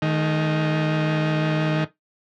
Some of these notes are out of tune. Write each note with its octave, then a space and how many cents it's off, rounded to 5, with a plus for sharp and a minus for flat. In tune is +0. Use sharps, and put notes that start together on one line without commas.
D#3 +0 A3 -45